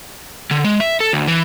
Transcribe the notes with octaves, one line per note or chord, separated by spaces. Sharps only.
D3
G#3
E5
A4
D2
E3